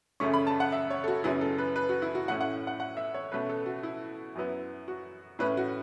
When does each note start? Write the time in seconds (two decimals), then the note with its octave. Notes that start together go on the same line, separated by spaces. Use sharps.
0.20 F#2 C#3 A3 C#4 C#6
0.34 B5
0.47 A5
0.60 F#5
0.72 E5
0.90 C#5
1.04 A4
1.08 F#4
1.24 F#2 C#3 F#3 B3 E4
1.41 A4
1.58 B4
1.76 B4
1.89 F#4
2.02 E4
2.15 F#4
2.28 A2 A3 C#4 E4 F#5
2.41 F#5
2.67 F#5
2.80 F#5
2.97 E5
3.14 C#5
3.32 B2 A3 C#4 B4
3.49 A4
3.66 F#4
3.83 E4
4.35 F#2 F#3 B3 E4
4.88 F#4
5.39 A2 A3 C#4 B4
5.57 F#4